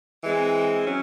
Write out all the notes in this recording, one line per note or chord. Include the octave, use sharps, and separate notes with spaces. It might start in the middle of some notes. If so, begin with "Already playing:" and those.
E3 G#3 C4
F#3 C#4